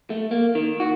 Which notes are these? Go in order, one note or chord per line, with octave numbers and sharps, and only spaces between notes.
A3
A#3
D#3
F#4